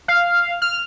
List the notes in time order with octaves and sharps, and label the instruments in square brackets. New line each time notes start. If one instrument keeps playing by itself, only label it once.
[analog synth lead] F5
F6